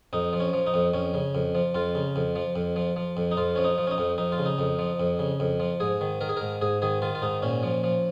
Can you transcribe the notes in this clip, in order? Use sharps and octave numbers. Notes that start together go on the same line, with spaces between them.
F2 D#4
F3
C#4
F3
D#4
F2
F2 C#4
C#3
F2
F3
F2 F4
C#3
F2
F3
F2
F3
F3
F2
D#4
F2 F4
F3 C#4
D#4
F3
C#4
D#4
F2
F2 D#4
F4
C#3
D#4
F2
F3
F2
C#3
F2
F3
G#2 G#4
D#3
D#3 A#4
G#4
G#2 A#4
G#2 G#4
D#3 G#4
D#3 F4
F4
G#2 D#4
A#2 C#4
F3
F3